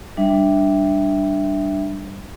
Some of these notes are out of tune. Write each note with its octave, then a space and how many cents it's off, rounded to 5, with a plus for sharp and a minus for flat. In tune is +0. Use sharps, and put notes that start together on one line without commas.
G3 +0 D4 +0 E5 +0